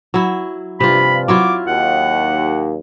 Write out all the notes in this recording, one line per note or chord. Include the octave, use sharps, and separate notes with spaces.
F#3 E4
G2 C3 F3 F4 B5
F#3 E4 F4 D6
D#2 F#5